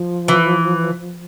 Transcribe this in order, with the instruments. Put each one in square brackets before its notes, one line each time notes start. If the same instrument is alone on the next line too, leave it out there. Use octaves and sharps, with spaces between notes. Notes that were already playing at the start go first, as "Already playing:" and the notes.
Already playing: [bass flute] F3
[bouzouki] E3